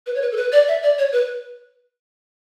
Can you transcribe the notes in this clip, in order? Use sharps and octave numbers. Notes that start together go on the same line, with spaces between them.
B4
C#5
B4
A4
B4
D5
E5
D5
C#5
B4